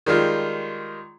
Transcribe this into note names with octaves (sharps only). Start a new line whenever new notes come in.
D#3 G3 G#3 F4